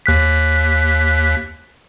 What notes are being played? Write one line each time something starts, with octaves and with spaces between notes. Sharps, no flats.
D#2 F#6 B6